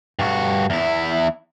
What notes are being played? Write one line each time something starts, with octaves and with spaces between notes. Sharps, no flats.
G2 F#4
E2 E4